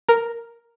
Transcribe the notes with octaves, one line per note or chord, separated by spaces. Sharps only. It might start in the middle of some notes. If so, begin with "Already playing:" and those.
A#4